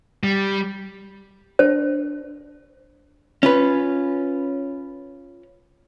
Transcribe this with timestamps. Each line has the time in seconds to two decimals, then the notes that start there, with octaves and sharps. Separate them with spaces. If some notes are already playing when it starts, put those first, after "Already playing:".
0.23 G3
1.59 D4 C5
3.43 C#4 F4 B4